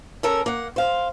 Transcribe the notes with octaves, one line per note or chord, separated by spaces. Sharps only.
C#4 A4 A#4
A#3 F#5
C5 F5